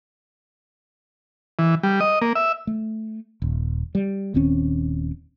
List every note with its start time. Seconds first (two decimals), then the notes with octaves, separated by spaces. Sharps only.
1.59 E3
1.83 G3
2.01 D#5
2.22 A#3
2.35 E5
2.67 A3
3.42 D#1
3.95 G3
4.34 D#1 D#2 C4 C#4